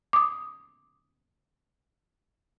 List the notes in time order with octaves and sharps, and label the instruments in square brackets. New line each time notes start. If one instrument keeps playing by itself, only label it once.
[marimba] D6 D#6